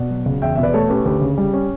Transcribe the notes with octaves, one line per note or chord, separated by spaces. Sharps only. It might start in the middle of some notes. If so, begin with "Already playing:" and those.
Already playing: B2 D5 F#5
F#3
C#2
E2 E5 G5
B2 E5
B4 D5
A3 A4 C#5
C#4 G4 B4
D2 G4 B4
C#3
G3
C#4